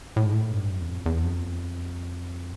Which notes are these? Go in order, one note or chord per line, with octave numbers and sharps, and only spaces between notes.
A2
G#2
A2
G2
F#2
E2
F2
E2
F2